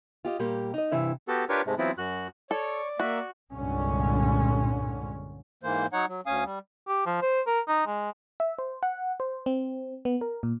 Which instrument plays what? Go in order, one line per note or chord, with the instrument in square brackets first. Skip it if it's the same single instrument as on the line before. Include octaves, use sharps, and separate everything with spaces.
[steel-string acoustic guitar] F4 G4 D#5
A#2 G3 A#3 G4
D#4 D#5
G2 C3 E3 E4 E5
[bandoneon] B3 F#4 G4 A4
D4 F4 G4 A#4 B4 C#5
G#2 C3 G#3 A3
E3 F#3 B3 C4 E4 F4
F#2 F#4 F#6
[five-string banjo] A4 [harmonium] C#5 [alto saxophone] D5
[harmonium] A#3 E5 [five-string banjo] F#4
[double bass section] C2 G2 A#2 D3 G#3 C#4
[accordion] G#2 E3 A#3 C5
F#3 D#4 C#5 F#5
F#3
D2 C#4 F5 G#5 D#6
G3
[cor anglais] G4
F3
C5
A#4
D#4
G#3
[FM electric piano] E5
C5
F#5
C5
C4
B3
A#4
A#2